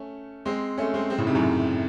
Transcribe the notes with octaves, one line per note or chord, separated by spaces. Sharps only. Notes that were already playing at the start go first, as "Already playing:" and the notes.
Already playing: A3 C#4
G#3 C4
A3 C#4
G#3 C4
G#3 C4
A2 C#3
G#2 C3
F#2 A2